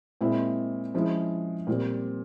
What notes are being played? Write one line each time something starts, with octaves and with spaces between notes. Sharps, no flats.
A#2 G#3 C4 E4
F3 G#3 C#4 E4
A#2 G3 C4